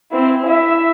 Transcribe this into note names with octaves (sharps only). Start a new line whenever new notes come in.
C4 E4
E4 E5